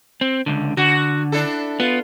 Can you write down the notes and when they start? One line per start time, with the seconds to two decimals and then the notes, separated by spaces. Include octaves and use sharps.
0.21 C4
0.46 C#2 D3
0.77 D3 F#4
1.32 D4 E4 A4
1.80 B3 F4